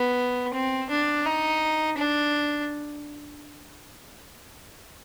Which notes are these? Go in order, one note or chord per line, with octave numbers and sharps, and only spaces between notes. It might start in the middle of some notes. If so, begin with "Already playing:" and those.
Already playing: B3
C4
D4
D#4
D4